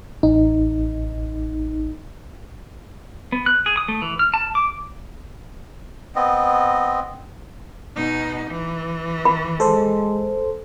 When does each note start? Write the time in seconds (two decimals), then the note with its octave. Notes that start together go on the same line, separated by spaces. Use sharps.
0.23 A1 D#4
3.32 B3
3.46 F#6
3.66 G#4
3.77 D#6
3.88 A3
4.02 E3
4.19 F6
4.34 A5
4.55 D6
6.16 B3 C4 D#5
7.95 B2 D#4
8.51 E3
9.25 B5
9.60 G#3 A4 C5